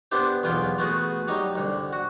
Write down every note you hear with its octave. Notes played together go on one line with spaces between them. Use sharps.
B3 D4 E4 G4 C5
B1 E2 B3 F4 G5
A3 B3 F#4 G#4
F#3 G3 D#4
C2 D3
F#4